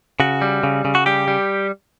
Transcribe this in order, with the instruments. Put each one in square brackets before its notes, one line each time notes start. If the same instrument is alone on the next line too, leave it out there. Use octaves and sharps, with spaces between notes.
[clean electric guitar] C#3 F#4
G3
C#3
C#3
F#4
G3 G4
G3